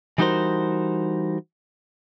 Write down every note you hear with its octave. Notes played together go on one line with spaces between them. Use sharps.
E3 G3 D#4 F#4 A#4 C5